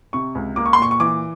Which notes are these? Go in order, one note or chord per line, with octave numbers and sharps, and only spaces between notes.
C3 C#6
C#2
A#3 D6
C#6
C6
A#2 C#6
C#6
E3 D6